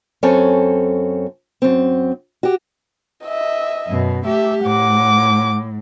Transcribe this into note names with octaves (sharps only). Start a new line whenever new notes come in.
F#2 C4 A4 C#5 G#5
F#2 C4
F#4 G4
D#5 E5
F#2 B2
A3 G4 E5
A2 F#5 D6